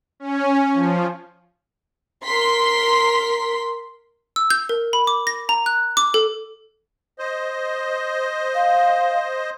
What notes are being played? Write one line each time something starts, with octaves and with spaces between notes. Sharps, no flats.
C#4
F3
A#4 C6 B6
E6
G6
A#4
B5
D6
A#6
A#5
F#6
D6
A4
C5 D#5
F5